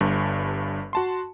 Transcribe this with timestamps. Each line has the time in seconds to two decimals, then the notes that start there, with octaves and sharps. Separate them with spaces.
0.01 G1 G2
0.93 F#4 A5 C6